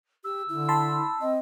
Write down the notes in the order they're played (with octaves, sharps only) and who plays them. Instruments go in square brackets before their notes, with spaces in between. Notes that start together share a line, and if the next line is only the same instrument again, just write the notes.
[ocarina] G4 [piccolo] E6
[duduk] D3 [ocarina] E4
[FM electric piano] A5 B5 C6
[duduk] C4 [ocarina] D#5